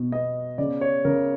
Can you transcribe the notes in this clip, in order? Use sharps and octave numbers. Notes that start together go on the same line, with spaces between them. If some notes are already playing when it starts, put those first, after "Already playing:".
Already playing: B2
B3 D#5
C#3 D5
C#5
C#3 A#4